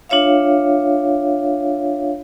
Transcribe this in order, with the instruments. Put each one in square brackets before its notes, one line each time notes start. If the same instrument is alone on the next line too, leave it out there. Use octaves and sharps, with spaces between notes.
[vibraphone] D4 F4 C#5 E5 F5